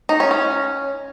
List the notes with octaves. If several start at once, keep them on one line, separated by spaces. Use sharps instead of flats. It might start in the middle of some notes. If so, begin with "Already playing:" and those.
D#4
C#4
C#4